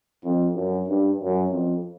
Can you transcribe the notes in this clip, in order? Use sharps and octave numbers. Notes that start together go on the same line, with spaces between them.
F2
F#2
G2
F#2
F2